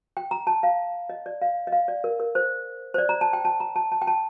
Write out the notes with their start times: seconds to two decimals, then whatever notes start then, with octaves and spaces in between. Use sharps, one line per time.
0.17 G5
0.31 A#5
0.47 A5
0.63 F5
1.10 D#5
1.26 D5
1.42 F5
1.67 D#5
1.72 F5
1.88 D5
2.04 A#4
2.20 A#4
2.35 C5
2.94 C5
2.98 D5
3.09 A#5
3.21 A5
3.33 G5
3.45 A5
3.60 A#5
3.76 A5
3.92 A5
4.02 G5
4.07 A5